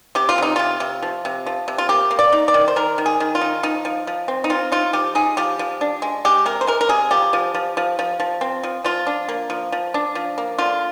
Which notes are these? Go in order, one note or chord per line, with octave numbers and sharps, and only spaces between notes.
C3 G4
F4
C3 D#4
C3 F4
C3
F3
C3
F3
C3
F4
A#3 G4
A#3
D5
D#4
D5
D#3
C5
D#3 A#4
D#3
G#4
D#3
F4
D#4
F3 D#4
F3
F3
C4
D#4
C4 F4
D#4 F4
F3 G4
D#4 G#4
F3 G4
F3
D4
G#3
G#3 G4
C3 A#4
C5
G#3 A#4
A#4
C3 G#4
F3 G4
F3
F3
F3
F3
F3
C4
F3
F3 F4
D4
A#3
F3
F3
D4
F3
A#3
D3 F4